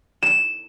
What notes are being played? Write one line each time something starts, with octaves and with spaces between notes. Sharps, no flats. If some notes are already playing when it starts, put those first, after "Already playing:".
E7